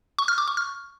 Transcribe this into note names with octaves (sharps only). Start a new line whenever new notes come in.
C#6
F6
D6
C#6
F6